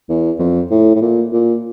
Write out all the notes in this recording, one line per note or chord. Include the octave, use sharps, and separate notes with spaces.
E2
F2
A2
A2
A#2
A#2